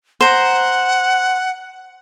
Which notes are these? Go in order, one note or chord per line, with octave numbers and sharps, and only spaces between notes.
C5 F#5 A#5